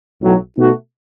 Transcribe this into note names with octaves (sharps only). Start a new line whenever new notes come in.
B1 A2 F#3
B2 A3 D#4 F#4